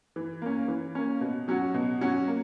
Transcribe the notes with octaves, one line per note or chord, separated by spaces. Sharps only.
E3
A#3 C#4
E3
A#3 C#4
B2
F#3 C#4 F#4
B2
F#3 C#4 F#4
A#3